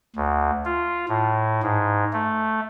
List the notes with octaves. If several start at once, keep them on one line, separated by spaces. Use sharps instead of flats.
D2
F4
A2
G#2
A3